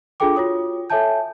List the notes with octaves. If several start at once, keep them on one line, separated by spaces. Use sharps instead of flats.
D4 F4 G#4 A4 G5 D6
F4 F#4 C#5 D#6
A4 C#5 E5 G#5 A5 G6